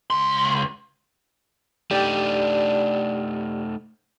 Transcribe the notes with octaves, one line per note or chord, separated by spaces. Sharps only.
C#2 C6
A3 D4 D#4 G4 D5 G5